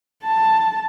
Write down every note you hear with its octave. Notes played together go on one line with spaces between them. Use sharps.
A5